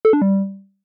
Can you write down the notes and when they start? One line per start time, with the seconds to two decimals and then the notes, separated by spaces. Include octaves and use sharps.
0.05 A4
0.13 D4
0.22 G3